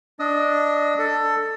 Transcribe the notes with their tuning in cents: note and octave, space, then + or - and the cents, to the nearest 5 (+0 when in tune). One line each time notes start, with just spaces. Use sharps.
D4 +0 D#5 +0 D#6 +45
A4 +15 A5 +10